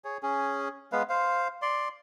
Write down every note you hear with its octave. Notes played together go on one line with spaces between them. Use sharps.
G#4 C#5
C#4 G#4
G#3 B3 B4 F5
C5 F5
D5 C6